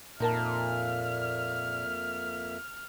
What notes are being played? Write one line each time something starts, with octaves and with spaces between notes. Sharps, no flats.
F2 A#2 A#3 D#4 A#4 E5 A5 F6